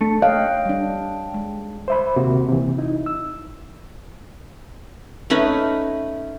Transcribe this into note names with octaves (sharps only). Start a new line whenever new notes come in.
A3 D4
C#5 D#5 F5 G5 F#6
G3 D4
G#3
C5 E5 B5
D#2 C3 A#3 F#4
C3 E3
D#4 E4
E6
A3 C#4 D#4 B4